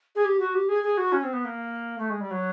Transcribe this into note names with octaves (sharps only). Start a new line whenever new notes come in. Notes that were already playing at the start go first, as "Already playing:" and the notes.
G#4
G4
F#4
G4
G#4
G#4
F#4
C#4
C4
B3
A#3
A3
G#3
G3
F#3